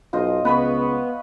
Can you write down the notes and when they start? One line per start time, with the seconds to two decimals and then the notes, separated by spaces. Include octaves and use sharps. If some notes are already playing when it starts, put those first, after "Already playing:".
0.13 B1 F4 C5 D#5
0.45 C#2 B3 B4 B5 C#6